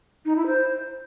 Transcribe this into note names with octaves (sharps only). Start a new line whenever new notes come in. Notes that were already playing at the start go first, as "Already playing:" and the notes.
D#4
E4
C5